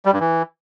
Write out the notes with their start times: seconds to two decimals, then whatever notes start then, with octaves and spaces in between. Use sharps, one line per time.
0.05 G3
0.13 G2
0.20 E3